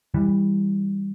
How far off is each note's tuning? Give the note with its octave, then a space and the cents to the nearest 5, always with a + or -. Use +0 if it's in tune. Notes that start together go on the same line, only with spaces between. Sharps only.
E3 -10 G3 +15